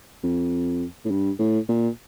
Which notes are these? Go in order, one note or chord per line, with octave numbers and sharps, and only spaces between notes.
F2
A2
G2
A2
A#2